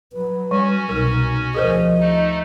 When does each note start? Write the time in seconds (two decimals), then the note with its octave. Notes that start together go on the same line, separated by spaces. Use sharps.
0.13 F#3 B4
0.51 G3 C#4 F#4 G#5
0.89 C2 B2 D#4 A#4
1.55 D2 F3 G#4 A#4 C5 D#5
2.00 A3 D#4